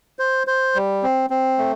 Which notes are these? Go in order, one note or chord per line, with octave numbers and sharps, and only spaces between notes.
C5
C5
G3
C4
C4
A3